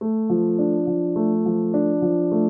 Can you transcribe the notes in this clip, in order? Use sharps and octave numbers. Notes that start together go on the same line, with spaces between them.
A3
F3
D4
F3
A3
F3
D4
F3
A3